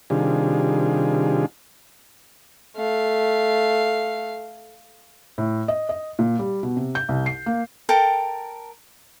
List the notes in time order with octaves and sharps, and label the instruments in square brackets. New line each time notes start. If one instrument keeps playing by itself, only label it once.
[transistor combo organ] C3 D#3 G3 D4 F4 G#4
[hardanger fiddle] A3 F5
[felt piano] A2
D#5
D#5
A#2
G3
B2
C3
G6
C2
C7
A#3
[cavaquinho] A4 A#4 G5